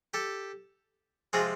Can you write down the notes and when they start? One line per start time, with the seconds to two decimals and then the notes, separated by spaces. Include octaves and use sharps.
0.14 G4 A4
1.33 C3 F3 G#3 C4 F4 F#4 G#4